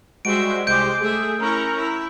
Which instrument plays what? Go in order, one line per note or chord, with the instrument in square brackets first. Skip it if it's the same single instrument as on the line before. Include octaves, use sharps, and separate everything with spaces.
[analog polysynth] G3 G#3 F#4 [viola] C5 E5 [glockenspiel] D7
[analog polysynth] C2 G#3 G4 [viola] C5 D6 [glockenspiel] G6 D7
[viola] A3 E5 [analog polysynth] G#4
[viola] C#4 E4 [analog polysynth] A#4 A#5 C#6
[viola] E4